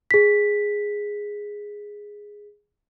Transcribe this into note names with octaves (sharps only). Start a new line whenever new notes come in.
G#4 B6